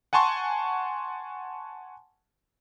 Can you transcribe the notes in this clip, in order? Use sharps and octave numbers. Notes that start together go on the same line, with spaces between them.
F#5 G#5 A5 C6 C#6